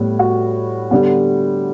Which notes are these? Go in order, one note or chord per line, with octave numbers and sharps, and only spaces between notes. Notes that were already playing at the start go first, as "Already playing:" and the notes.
Already playing: A2 G3 B3
F#4
D3 G3 B3